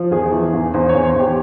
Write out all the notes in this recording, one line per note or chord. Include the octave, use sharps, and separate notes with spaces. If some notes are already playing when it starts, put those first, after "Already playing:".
Already playing: F3
E2 G#4
E3
E2
E2 C5
C#5
E2
C5
E2 G4